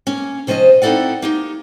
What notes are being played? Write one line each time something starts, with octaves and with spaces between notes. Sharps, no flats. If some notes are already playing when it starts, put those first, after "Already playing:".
A#3 C#4
C3 F3 C#4 C5 D#5
C4 D#4 E4 A4 D5 F#5
A#3 D#4 G4